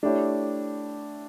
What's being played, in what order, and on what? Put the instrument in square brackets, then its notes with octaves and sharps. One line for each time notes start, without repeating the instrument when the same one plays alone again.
[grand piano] A3 E4 G4 C#5 [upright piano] D4